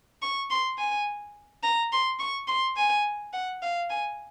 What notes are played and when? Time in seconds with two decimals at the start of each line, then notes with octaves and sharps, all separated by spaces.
0.22 C#6
0.50 C6
0.79 G#5
1.63 A#5
1.92 C6
2.19 C#6
2.48 C6
2.77 G#5
3.33 F#5
3.62 F5
3.90 G#5